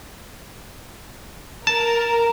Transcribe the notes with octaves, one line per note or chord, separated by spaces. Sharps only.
A#4 A5